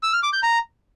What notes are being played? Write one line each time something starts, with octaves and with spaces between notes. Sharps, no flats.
E6
F6
D6
G6
A#5